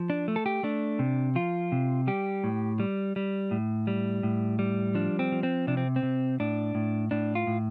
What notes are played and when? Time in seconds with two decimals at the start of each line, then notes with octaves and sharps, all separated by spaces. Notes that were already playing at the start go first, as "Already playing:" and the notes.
Already playing: F3
0.10 D4
0.28 A3
0.36 A4
0.46 G4
0.63 A3 D4
0.99 C3
1.35 F3 F4
1.72 C3
2.07 G3 G4
2.44 A2
2.80 G3
3.16 G3
3.51 A2
3.87 G3
4.23 A2
4.59 G3
4.95 F3 D4
5.19 C4
5.32 F3
5.43 C4
5.67 C3 D4
5.77 C4
5.96 C4
6.03 C3
6.40 A2 D4
6.75 A2
7.11 A2 D4
7.35 F4
7.47 A2